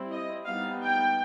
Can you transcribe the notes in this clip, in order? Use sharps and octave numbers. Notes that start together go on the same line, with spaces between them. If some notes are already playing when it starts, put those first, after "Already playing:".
Already playing: G3 C4 E4
D#5
G3 B3 D#4 F5
G5